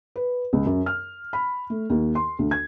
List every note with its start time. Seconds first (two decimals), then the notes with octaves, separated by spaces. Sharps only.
0.16 B4
0.53 C#2
0.65 F#2
0.86 F6
1.33 B5
1.70 A3
1.90 D#2
2.15 C6
2.39 D2
2.51 G#6